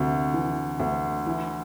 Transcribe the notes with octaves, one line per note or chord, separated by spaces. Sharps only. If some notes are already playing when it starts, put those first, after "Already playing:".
Already playing: D2 C3
E3
D2
E3 E4